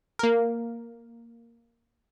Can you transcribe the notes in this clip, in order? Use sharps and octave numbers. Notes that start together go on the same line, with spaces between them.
A#3 A#4